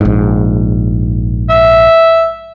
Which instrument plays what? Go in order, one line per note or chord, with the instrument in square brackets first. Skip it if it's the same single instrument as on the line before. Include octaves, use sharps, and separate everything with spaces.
[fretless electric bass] A#1 G#2
[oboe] E5